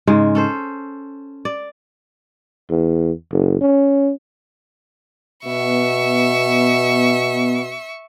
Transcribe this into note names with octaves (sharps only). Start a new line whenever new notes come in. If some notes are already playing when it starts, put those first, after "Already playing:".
G#2 C#3 G#3
C#4 A4 C5
D5
E2
F#1
C#4
B2 B3 E5 C#6